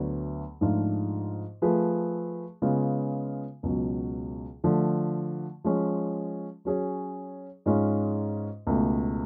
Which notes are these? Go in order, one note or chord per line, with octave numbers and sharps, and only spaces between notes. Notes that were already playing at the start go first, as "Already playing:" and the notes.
Already playing: D2 D3 F#3 B3
G#2 F3 A3 D4 F4
F3 A3 F4 G#4 B4
C#3 G#3 B3 F4
C#2 B2 F#3
D3 F3 A3
F3 G#3 C#4
F#3 C#4 G#4 C#5
G#2 G#3 C#4 F4
C#2 B2 A3